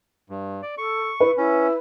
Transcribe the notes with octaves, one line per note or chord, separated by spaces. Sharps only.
G2
D5
A4 C#6
E4 B4
C#4 E4